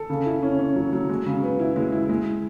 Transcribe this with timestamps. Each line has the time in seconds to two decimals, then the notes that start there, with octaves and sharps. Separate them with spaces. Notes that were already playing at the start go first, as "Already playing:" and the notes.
Already playing: A4
0.10 C#3
0.26 E4
0.43 C#4
0.59 C#4
0.76 F#3
0.93 F#3
1.09 G#3
1.26 C#3
1.43 B3
1.60 E4
1.76 G#3
1.92 E4
2.09 G#3